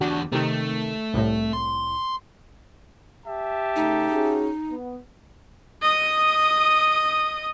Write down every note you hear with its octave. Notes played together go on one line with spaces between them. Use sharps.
E2 D4 F#4 G4
C3 D#3 A3
C2 A2
C6
G4 E5 A5
C#3 A3 D#4
C#4 F#4 G#4
B3
D#5 D#6